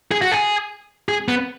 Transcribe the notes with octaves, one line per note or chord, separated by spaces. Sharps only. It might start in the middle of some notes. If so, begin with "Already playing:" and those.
G#4
F#4
G#4
G#4
B3